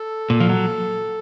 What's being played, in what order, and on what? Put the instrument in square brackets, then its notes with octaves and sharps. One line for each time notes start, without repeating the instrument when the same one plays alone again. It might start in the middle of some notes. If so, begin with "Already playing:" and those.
Already playing: [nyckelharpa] A4
[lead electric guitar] A#2
F3
F#3